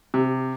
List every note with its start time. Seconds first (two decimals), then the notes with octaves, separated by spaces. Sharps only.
0.14 C3